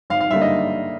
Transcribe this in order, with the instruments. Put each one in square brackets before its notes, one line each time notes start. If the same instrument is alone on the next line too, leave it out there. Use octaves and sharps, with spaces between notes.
[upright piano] G#1 F5
F5
G2 D3 G3 A#3 E5
D#5